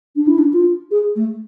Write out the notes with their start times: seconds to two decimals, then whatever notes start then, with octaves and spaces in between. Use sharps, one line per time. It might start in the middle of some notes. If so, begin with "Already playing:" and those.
0.16 D4
0.27 E4
0.38 D4
0.53 F4
0.91 G#4
1.16 A3